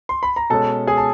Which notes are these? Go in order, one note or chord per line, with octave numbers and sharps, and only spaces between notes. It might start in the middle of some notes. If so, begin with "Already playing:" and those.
C6
B5
A#5
B2 G#3 C#4 A4 A5
G#4 G#5
A5